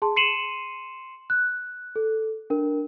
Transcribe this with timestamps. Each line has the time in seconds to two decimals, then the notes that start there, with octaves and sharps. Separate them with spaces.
0.02 G#4 A5 C6
0.16 C6 C7 C#7 D#7 E7 F#7
1.30 F#6
1.96 A4
2.50 D4 A#4